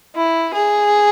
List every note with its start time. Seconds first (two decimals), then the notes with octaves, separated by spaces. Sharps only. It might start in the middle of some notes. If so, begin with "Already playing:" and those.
0.16 E4
0.53 G#4